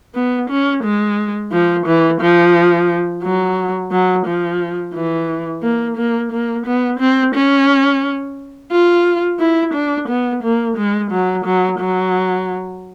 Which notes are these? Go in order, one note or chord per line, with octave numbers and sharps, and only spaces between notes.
B3
C#4
G#3
F3
E3
F3
F#3
F#3
F3
E3
A#3
A#3
A#3
B3
C4
C#4
F4
E4
D4
B3
A#3
G#3
F#3
F#3
F#3